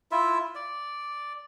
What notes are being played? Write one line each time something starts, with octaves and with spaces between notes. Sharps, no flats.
E4 F4 E5
D5